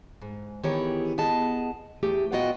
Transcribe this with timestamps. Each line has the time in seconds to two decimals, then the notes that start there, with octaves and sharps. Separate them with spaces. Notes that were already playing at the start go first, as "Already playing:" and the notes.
0.22 G#2
0.63 D#3 E3 B3 G4 G#4 C#5
1.18 B3 G#4 D#5 A5
2.03 E2 A3 G4 G#4
2.32 A#2 B3 F4 F#4 D#5 G5